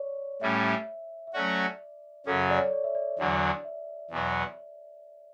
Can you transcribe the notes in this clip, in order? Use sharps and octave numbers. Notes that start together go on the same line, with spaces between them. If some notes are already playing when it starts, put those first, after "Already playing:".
Already playing: C#5 D5
A2 G3 C#4 E5
E5
F#3 A3 C#4 F#4 D5
F#2 C#3 F#3 C#4 A4
D5
C#5
D5
E5
D5
E2 D3 F#3
E5
E2 B2 F#3 B3